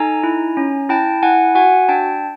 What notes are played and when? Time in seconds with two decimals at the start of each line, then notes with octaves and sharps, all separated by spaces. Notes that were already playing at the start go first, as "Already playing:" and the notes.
Already playing: D#4 A4 G#5 A#5
0.23 E4
0.57 C#4
0.89 E4 G5 A5
1.22 E4 F#5 G#5
1.55 F#4 F#5 G#5
1.89 D4 G5 A5